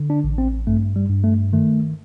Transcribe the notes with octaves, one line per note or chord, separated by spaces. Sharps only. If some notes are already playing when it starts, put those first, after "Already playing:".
Already playing: D3
D4
A1
C4
G2 A3
G3
G2
A3
D#3 A3